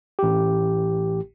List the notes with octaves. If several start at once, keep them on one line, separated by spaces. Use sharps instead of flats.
A1 G4